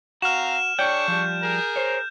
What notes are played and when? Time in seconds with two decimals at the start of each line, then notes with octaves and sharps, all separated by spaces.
0.22 C4 F#4 F5 A#5 F6 E7
0.79 D4 G#4 C#5 D5 G5 C#6 G6
1.08 F3 G3
1.43 G#4 A#4
1.76 C5 C#5